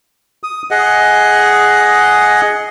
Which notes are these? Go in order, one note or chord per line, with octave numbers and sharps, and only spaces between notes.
D#6
G#4 D#5 F#5